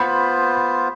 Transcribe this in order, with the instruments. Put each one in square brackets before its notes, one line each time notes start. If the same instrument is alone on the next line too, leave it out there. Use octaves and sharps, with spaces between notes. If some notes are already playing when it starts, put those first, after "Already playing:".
Already playing: [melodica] B3 F4 C5 [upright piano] B5